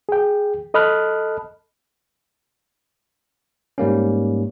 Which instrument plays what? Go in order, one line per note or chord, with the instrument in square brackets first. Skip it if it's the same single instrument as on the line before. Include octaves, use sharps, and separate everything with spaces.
[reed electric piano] G#4 G5
A4 D#5 A5 B5 F6 F#6
[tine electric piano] G#2 G3 A#3 C#4